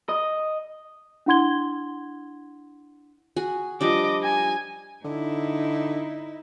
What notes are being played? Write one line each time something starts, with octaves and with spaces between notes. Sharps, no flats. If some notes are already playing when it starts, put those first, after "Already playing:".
D#5
D4 E4 F#5 C6 G#6 G7
F#4 G#4 G#5
F3 G3 D4 D#5 D6
G#5
D3 D#4 E4